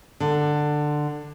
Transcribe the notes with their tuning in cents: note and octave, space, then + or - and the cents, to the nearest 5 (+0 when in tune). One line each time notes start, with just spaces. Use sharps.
D3 +15